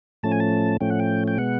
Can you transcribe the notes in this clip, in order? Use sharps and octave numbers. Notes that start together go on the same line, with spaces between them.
A2 F3 A3 C#4 A5
G#5
A5
A2 F3 A3 C#4 G5
F#5
G5
G5
B2 G#3 B3 F#5